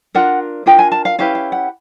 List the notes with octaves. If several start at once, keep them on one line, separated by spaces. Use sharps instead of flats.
D4 F4 A#4 F#5
D4 F4 A#4 G5
G#5
A5
F5
C#4 E4 G4 B4 F5
F5
F#5